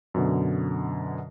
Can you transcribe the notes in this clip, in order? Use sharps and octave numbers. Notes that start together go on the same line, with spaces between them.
F#2 B2 D3